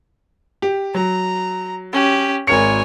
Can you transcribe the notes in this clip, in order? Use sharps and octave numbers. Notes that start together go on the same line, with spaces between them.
G4
F#3 A#5
C#4 G4
G#1 A#4 C#5 G#5 C#7